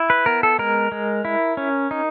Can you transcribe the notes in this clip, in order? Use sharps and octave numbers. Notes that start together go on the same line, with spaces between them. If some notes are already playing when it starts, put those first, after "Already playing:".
Already playing: E4
B4
B3 A#4
A4
G#3 A#4
G#3
E4
C#4
D#4